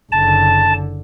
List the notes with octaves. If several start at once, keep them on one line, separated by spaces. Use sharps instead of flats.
F#1 D3 A5